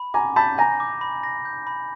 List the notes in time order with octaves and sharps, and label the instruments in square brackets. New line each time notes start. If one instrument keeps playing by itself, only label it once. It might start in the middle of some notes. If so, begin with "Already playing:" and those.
Already playing: [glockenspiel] B5
[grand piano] G#5 A#5 [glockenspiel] D6
[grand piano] A5 B5 [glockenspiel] G6
[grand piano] G#5 A#5 [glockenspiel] A#6
[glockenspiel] D6
B5
A#6
G6
B5